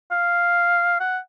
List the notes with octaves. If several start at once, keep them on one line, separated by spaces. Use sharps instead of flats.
F5
F#5